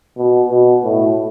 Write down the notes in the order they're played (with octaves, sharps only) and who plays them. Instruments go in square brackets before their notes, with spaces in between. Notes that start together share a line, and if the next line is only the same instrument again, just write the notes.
[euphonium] B2
B2
A2